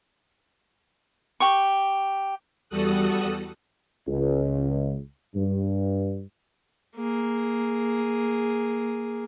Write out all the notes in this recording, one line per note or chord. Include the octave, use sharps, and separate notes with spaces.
G4 C#6
E2 G3 F#4 A4 D#6 F#6
C#2
G2
A#3 G#4